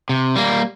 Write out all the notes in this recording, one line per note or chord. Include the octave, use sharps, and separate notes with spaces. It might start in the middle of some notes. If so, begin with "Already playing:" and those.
C3
G3 A#3